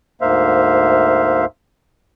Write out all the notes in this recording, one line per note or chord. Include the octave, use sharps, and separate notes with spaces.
D2 G#2 A#3 C5 E5 F5